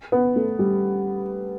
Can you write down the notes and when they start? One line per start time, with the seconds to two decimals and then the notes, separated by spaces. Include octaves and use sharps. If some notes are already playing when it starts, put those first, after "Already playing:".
0.12 B3
0.36 A3
0.59 G3